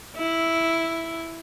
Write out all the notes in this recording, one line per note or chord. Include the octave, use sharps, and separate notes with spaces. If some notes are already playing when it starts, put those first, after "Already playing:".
E4